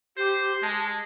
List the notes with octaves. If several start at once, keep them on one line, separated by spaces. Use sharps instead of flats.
G4 C5
G#3 A5